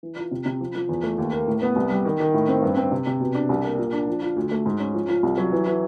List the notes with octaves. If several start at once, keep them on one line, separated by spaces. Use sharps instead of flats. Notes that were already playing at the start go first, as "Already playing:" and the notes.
E3
F4
C3
C3
F3
F3
E2
A3
D#2
A#3
A2
B3
C2
G3
D#3
D#3
A2
C4
G2
C4
C3
C3
B2
D4
C2
A#3
A#2
D4
F3
F4
D2
A3
G#2
C#4
F3
F4
C2
F#3
E3
E3